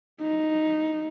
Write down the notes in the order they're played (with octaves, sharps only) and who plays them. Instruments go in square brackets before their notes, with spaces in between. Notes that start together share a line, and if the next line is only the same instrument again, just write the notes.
[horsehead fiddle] D#4